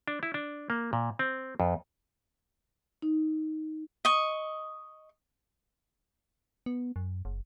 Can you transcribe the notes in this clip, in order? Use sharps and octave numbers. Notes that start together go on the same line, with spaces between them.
D4
E4
D4
A#3
A#2
C4
F2
D#4
D#5 C#6
B3
F#2
F#1